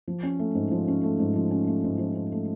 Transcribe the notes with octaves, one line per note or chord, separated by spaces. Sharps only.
F3
C#4
A3
G#2
F3
C#4
A3
G#2
F3
C#4
A3
G#2
F3
C#4
A3